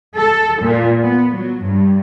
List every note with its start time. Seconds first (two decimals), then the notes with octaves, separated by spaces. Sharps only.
0.16 A4
0.62 A#2
1.03 B3
1.35 F#3
1.64 G2